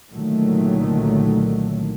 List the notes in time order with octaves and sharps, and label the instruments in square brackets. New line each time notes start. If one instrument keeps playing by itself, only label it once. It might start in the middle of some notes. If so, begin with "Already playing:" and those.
[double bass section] C2 A#2 D3 D#3 F#3 A3